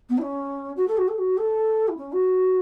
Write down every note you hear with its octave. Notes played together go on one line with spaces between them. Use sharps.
B3
E4
C#4
F#4
A4
F#4
A4
F#4
A4
E4
C#4
F#4